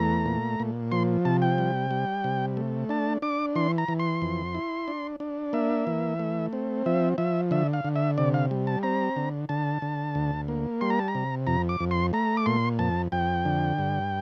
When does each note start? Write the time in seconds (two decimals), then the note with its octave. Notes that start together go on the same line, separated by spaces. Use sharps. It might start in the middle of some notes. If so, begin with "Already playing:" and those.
Already playing: E2 A3 A#5
0.26 A#2
0.60 A#2
0.92 F3 C6
1.25 C3 A5
1.42 G5
1.58 G3
1.91 G3
2.24 C3
2.57 A3
2.89 D4 A5
3.22 D4 D6
3.56 E3 C6
3.78 A#5
3.88 E3
3.99 C6
4.22 F2
4.55 E4
4.88 D4
5.20 D4
5.53 A#3 E5
5.87 E3
6.19 A3
6.53 C4
6.86 F3 E5
7.18 F3 E5
7.51 D3 E5
7.73 F5
7.85 D3
7.96 E5
8.18 C3 D5
8.34 F5
8.51 G3
8.67 A5
8.83 C4 A#5
9.16 D3
9.49 D3 A5
9.82 D3
10.15 D2
10.48 A#3
10.81 G3 C6
10.90 A#5
10.99 A5
11.08 A#5
11.15 C3
11.47 F2 A#5
11.69 D6
11.80 F2
11.91 C6
12.13 A3 A#5
12.37 D6
12.46 A#2 C6
12.79 F2 A5
13.12 F2 G5
13.45 D3
13.78 G2